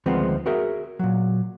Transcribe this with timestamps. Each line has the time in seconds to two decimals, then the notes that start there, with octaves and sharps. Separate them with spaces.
0.06 D2 D#3 F3 G#3 B3 C4
0.46 F#4 G#4 A#4 E5
0.99 A#2 F#3